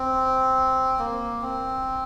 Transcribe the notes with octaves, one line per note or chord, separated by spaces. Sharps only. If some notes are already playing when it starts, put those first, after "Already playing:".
Already playing: C4
A#3
C4